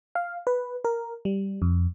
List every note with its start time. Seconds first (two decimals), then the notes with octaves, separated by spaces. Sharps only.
0.15 F5
0.47 B4
0.84 A#4
1.25 G3
1.62 F2